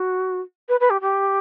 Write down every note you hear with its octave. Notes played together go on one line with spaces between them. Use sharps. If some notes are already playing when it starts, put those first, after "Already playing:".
Already playing: F#4
B4
B4
G4
G4